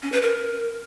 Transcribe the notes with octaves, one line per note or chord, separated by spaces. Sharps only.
C#4
B4
A#4